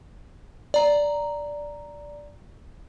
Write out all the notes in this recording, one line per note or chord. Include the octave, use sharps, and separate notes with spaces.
D5 A#5